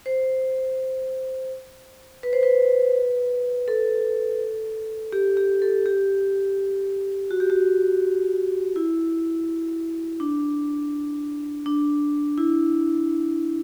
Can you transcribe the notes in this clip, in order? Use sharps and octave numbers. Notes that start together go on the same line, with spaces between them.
C5
B4
C5
B4
A4
G4
G4
A4
G4
F#4
G4
F#4
E4
D4
D4
E4